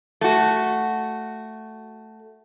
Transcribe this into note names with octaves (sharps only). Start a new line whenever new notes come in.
A3 F#4